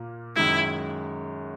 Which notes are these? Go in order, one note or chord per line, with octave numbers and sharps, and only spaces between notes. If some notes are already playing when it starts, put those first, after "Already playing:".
Already playing: A#2 A#3
F#2 D#3 G#3 E4